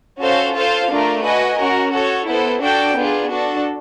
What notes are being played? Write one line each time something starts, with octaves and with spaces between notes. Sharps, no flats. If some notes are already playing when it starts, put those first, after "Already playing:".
C#4 F#4 A4 C5 F5
F4 A4 C5 F5
A3 D4 F4 A#4
F#4 B4 D#5 G#5
C#4 F#4 A#4
F#4 A4 C#5
B3 E4 A4 C5
D4 F#4 A4 D5 G5
B3 D4 F4 G#4
D4 F#4 A4